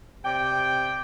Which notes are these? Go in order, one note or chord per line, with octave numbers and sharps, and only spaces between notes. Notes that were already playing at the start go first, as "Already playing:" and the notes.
C3 D5 G5